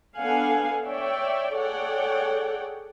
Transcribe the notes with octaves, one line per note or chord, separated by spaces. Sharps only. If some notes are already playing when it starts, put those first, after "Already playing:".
B3 D4 A4 F5 F#5 G#5
C#5 D5 E5 G5
G#4 A4 C#5 D5 F#5 G5